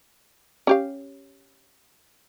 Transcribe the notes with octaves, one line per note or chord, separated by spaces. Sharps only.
C#4 G4 F5